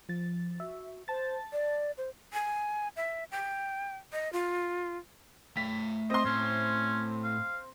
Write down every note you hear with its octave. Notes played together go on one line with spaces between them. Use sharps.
F3 A6
F#4 E5
C5 A5 A6
D5
C5
G#5
E5
G5
D#5
F4
A3 G5 B6
C4 D#5 C6
A2 C#4
F5